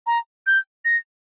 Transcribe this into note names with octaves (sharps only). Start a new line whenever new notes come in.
A#5
G6
A#6